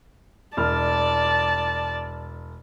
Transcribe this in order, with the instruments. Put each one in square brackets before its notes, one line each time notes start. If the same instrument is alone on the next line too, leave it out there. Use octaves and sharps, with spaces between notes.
[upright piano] E1 F6 [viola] D5 A5